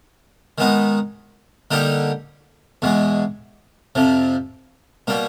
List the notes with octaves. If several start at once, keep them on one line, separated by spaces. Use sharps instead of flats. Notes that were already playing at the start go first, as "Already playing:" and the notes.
D#3 G#3 B3 D#4
D3 G3 A#3 D#4 G4
E2 B2 G#3
F2 C3 F3
B2 G3 A#3